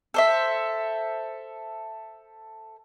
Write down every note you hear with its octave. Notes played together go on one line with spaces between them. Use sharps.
A4 C5 E5